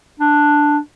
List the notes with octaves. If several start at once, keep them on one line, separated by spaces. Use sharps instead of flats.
D4